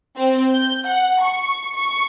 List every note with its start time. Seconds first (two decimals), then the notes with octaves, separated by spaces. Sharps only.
0.16 C4
0.50 G6
0.87 F#5
1.22 C#6
1.75 C#6